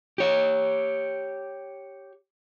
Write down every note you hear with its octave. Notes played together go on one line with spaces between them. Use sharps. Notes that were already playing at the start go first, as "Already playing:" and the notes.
G4 C#5